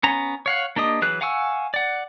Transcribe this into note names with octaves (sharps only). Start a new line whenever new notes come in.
B3 C#4 A#5
C#5 F5 F#5
A#3 D4 G4 D#5 D#6
E3 F#3 G#4 B4 F#6
F5 F#5 G#5 C#6 E6
D5 F#5